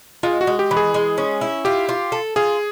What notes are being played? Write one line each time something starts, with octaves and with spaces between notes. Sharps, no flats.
G#3 F4
F#4
G#3
G4
E3
G#4
G#3
C#4
E4
F4 G4
F4
A4
F4 G#4